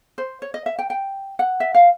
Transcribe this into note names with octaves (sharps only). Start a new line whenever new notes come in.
C5
C#5
D#5
E5
G5
G5
F#5
E5
F5